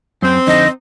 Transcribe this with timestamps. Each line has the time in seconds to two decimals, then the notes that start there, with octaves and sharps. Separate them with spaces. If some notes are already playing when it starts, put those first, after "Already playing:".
0.22 F#2 C4
0.47 F2 D3 D#4 D#5